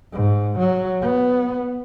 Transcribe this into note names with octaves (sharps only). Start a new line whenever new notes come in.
G#2
F#3
B3